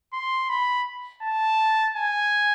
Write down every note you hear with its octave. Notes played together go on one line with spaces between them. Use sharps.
C6
B5
A5
G#5